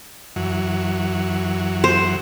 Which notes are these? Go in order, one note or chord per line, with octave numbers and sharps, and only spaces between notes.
F#2 E3 F#3
C5